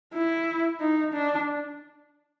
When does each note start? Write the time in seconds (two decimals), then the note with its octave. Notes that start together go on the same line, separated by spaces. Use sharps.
0.14 E4
0.80 D#4
1.14 D4